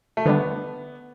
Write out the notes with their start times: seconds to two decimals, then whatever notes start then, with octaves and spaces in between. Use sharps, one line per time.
0.17 A3
0.26 D3 G3 B3 D4